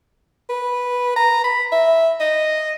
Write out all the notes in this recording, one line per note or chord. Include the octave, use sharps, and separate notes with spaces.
B4
A#5
B5
E5
D#5